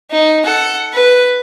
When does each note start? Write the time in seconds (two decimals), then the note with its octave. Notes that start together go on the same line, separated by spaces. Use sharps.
0.11 D#4
0.44 A4 F#5
0.94 B4